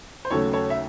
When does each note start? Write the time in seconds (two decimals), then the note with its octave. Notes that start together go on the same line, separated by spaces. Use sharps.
0.25 C5
0.31 D#2 C#3 F#3 A3 A4 C#5
0.53 A4 C#5
0.70 E5